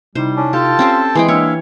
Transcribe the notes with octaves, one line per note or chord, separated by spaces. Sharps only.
C3 G3 D#4 E4 C5
C#4 D4
F4 G4 A4 G5 A5
C4 C#4 G4 C5
E3 G#3 C4 G#4 G5 C6
A#3 D4 E4 C#5 E5 F5